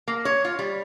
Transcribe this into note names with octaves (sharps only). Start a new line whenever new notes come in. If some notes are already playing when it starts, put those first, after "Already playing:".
A#3
C#5
F4
G3